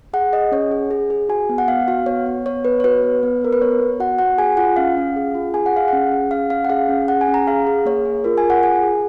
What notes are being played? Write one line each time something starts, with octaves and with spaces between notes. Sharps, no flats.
G#4 F#5
G#4 D#5
C#4 C#5
G#4
G#4
G#4
F#4 G#5
B3
F#5
B3 F5
F#4 F5
B3 C#5
B3
B3 C#5
B3 B4
C#5
F#4 B4
B3
B3
B3 A#4
B4
B3 C#5
B3
F#4 F#5
F#4 F#5
G#4 G#5
F4 F#5
C#4 F5
C#4
G#4
F4
G#4 G#5
F#5
G#4 F5
C#4 F#5
G#4
C#4 F5
C#4 F5
F#5
G#4 F5
C#4
G#4 F#5
G#5
C#4
A#5
G#4 F5
G#4
A#3 C#5
G#4
F4 A#4
G#5
F4
F#5
G#4 G#5
G#4